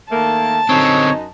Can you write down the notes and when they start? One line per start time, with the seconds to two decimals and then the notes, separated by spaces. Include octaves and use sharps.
0.11 D#3 A3 A#3 A5
0.69 F#2 D3 C4 D#4 C#5 D#5